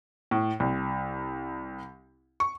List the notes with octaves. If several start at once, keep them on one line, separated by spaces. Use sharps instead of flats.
A2
C2
C#6